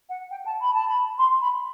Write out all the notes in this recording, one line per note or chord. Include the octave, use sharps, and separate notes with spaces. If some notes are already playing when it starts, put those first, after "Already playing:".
F#5
G5
A5
B5
A5
B5
C6
B5